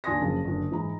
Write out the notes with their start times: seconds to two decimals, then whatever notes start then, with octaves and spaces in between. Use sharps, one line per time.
0.04 D#2 D4 G#5 C6 D#6 A#6
0.21 F#1 C#3 F3 A5
0.45 F#1 D3
0.71 G#2 E3 A#5